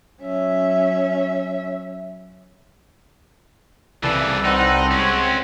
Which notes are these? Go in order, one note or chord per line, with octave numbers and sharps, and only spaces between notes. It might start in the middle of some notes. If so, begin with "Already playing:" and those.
F#3 C#4 E5
C2 C#3 E3 A4 B4 D5
C4 D#4 F#5
G#3 C#4 C#5